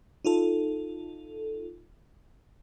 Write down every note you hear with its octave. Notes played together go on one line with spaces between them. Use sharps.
D#4 F4 A4